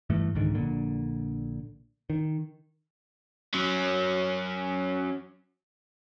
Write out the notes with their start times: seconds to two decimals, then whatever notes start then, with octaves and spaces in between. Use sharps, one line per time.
0.10 G2 E3 A3
0.35 C2 G#2 D3 D#3
0.55 A#1 A#2 D3
2.10 D#3
3.54 F#3 C#4